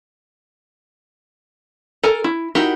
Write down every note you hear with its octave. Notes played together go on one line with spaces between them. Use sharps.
A4 A#4 G#5 A#5
E4
D#4 E4 F#4 G4 A#4